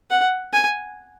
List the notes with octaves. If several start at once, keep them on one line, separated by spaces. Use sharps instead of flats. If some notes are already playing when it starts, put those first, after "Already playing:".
F#5
G#5